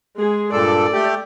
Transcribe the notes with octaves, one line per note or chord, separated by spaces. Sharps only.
G#3 G#4
G2 A#2 A4 D5
A3 G4